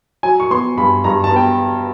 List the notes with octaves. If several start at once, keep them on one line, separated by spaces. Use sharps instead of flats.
F#3 G#5
C#6
B3 C6
G2 B5
G2 A#5
A5
B3
G5